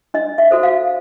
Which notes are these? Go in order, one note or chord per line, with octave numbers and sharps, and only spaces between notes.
D4 D#5
E5
F#4 A4 C5
F5